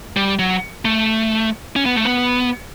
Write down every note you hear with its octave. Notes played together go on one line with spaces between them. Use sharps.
G3
F#3
A3
C#4
B3
A3
B3